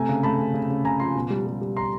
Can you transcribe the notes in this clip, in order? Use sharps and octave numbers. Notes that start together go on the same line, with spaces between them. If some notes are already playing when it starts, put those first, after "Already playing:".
Already playing: C3 A3 G#5 A#5
C#3
A3 A5 B5
C#3
C#3
C#3
C#3 G#5 A#5
F3 A#5 C6
B2
G3
G3
G3
A#5 C6